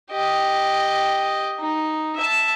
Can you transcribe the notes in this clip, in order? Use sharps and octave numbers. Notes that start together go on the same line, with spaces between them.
G4 D#5
D#4
E5 A5